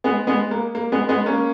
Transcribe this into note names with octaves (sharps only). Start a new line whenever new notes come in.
G#3 B3
G#3 B3
A#3
A#3
G#3 B3
G#3 B3
A#3 C#4